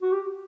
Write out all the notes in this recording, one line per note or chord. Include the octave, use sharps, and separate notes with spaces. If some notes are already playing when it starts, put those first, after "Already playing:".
F#4
G4